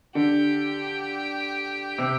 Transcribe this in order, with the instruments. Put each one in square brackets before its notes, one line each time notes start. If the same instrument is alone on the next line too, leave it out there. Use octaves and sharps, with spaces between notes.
[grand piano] D3 [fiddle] G4
[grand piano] C3